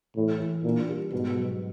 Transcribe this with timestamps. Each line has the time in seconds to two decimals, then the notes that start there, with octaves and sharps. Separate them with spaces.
0.16 A2 E3
0.40 E3
0.64 A#2 D4
0.89 G3
1.12 G#2 B2
1.36 F#3